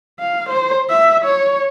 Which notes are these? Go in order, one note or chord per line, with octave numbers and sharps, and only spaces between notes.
F5
C5
E5
C#5